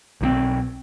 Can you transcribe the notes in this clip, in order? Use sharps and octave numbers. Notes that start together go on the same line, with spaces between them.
B1 D#3 C4